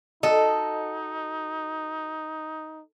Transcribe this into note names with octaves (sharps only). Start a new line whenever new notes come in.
D#4 F#4 A4 D#5